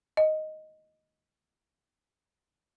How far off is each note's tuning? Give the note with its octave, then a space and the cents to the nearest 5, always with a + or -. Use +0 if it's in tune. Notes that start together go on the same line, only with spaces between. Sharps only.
D#5 +0